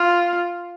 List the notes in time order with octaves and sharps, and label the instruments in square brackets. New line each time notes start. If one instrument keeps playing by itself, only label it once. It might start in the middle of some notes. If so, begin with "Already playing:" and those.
Already playing: [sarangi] F4